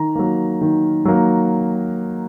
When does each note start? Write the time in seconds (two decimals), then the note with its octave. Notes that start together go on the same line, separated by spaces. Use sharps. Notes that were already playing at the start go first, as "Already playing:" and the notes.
Already playing: D#3 A#5
0.15 F#3 A#3
0.61 D#3
1.05 F#3 A#3